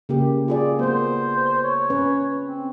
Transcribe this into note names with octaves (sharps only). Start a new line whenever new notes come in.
C#3 A#3 G4
F4 G#4 D5
A#3 B3 C5
C#5
C#4 B4
C4